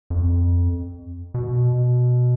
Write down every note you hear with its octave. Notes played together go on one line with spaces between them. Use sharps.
F2
B2